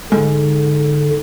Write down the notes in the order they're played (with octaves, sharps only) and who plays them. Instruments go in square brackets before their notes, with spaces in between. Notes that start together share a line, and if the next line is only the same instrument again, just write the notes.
[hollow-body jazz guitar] G#2 [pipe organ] D3